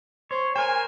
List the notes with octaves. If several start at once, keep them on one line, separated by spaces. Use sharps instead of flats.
C5 C#5
A#4 C5 G#5